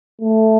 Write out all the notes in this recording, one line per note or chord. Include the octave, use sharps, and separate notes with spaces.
A3